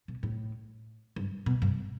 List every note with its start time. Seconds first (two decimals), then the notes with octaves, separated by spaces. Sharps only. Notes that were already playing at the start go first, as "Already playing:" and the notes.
0.08 B2
0.23 A2
1.16 G2
1.46 B2
1.62 G2